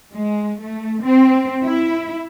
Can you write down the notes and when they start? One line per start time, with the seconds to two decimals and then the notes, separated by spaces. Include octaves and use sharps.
0.14 G#3
0.60 A3
1.02 C4
1.65 E4